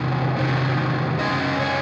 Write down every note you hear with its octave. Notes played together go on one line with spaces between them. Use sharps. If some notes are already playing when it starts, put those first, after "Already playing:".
Already playing: E2 C3 D#3 C#5
E2 C3 D#3
F#2 C#3 G#3 C#4 D#5
C#5